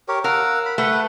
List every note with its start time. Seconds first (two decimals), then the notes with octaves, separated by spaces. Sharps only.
0.08 G4 A#4 C#5
0.24 A#4 F5 F#5 E6
0.66 B5
0.78 A3 B4 F#5